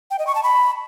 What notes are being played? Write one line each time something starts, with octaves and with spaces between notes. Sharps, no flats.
G5
D#5
C#6
A5
B5